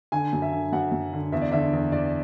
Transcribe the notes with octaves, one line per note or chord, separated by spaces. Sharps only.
D3 G#5
F#2
E5
D3
F#2 F#5
F#2
D3
E2 E5
D5
D3 E5
E2
E2 D5